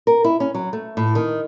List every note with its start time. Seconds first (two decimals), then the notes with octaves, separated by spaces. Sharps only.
0.07 A#4
0.25 E4
0.40 C#4
0.54 F#3
0.73 A3
0.97 A2
1.15 D#3